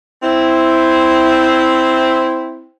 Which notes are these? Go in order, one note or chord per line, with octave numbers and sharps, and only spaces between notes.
C4 E4